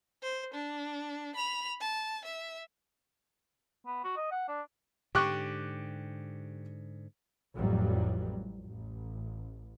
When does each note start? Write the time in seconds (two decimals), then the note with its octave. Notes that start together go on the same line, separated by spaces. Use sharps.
0.22 C5
0.54 D4
1.36 B5 F7
1.80 A5
2.25 E5
3.86 B3
4.04 F#4
4.17 D#5
4.31 F#5
4.48 D4
5.15 G#2 D3 G4 C#6 F#6
7.55 A1 F2 F#3 G3
8.64 A1